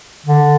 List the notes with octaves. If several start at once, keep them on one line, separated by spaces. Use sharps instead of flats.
D3